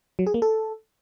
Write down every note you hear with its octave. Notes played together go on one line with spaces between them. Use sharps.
F#3
G#4
A#3
A4